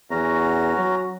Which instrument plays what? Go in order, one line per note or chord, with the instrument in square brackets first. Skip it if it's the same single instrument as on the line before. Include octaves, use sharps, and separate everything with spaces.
[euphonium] E2 [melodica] C#4 F#4 A#5
[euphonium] F#3